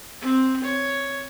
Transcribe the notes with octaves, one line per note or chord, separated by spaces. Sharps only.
C4
C#5